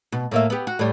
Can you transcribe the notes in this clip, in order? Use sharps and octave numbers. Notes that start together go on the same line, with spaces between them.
B2
A2 A#3 E5
B3 G4
F#4
A2 G3